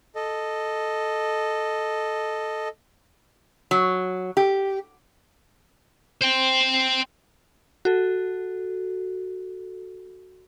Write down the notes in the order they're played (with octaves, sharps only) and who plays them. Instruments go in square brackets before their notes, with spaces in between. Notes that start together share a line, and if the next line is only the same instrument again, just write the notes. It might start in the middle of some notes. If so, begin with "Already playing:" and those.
[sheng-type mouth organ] A4 D#5
[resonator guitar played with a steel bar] F#3
G4
[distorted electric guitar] C5 G5
[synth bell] F#4 A4